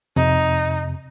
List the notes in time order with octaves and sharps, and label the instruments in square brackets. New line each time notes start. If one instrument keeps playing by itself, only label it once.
[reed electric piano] F2 C3 [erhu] D#4